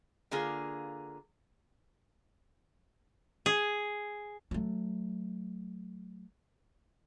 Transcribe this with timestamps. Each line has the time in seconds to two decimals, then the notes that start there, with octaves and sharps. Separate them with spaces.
0.31 D3 A#3 F4 G#4
3.46 G#4
4.51 F#3 A3